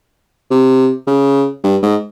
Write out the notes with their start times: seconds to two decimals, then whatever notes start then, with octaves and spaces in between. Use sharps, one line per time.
0.51 C3
1.07 C#3
1.64 G2
1.82 G#2